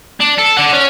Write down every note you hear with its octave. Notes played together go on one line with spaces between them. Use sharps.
D4
A4
D5 F#5
C#4